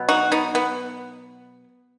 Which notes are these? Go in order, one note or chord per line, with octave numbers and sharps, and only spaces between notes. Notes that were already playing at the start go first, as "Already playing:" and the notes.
Already playing: B2 F#3 B3
D#4 F#4
B3 D#4
B3